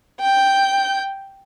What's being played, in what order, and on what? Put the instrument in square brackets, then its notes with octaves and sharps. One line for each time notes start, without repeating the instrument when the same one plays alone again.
[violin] G5 G6